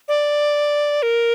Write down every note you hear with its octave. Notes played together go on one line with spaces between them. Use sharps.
D5
A#4